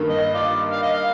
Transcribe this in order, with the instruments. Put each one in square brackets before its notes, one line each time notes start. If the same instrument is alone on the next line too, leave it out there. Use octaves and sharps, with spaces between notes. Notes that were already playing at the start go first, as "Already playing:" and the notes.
Already playing: [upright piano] G2 D#3 A#3
[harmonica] D#5
F4 D5
F5
D#5
F5